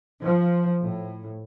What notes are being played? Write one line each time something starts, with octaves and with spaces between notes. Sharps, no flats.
F3
A2